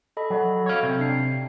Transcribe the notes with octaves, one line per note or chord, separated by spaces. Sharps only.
A4 D#5 B5
F#3
C#5 F5
C3
D4 C7